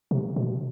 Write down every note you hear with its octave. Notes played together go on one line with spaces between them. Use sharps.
C3
B2